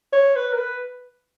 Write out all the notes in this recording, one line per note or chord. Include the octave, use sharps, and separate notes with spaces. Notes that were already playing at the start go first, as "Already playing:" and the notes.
C#5
B4
A#4
B4